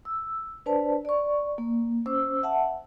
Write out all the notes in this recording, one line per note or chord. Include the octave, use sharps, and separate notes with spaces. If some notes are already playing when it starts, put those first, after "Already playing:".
E6
D4 B4 C5 D5 A5
D5 C#6
A#3
C#4 C5 D6 E6
E5 F#5 A5